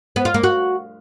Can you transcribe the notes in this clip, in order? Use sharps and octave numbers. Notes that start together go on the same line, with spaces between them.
B3
F4
A#3
F#4